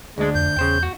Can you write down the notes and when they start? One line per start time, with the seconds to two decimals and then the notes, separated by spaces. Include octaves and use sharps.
0.18 D2 G#3 D4
0.35 F2 G6
0.57 E2 C#3 C5 G5
0.83 F#4